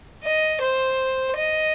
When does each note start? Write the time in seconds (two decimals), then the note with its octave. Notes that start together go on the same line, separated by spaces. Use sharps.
0.23 D#5
0.61 C5
1.37 D#5